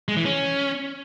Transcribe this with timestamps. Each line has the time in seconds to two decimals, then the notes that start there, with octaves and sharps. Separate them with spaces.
0.08 G#3
0.17 E3
0.25 C#4